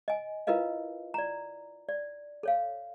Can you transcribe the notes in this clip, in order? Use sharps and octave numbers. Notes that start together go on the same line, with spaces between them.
D#5 G#5
E4 F4 A#4 B4 D#5 F5
D5 A#5
D5
A4 C#5 F5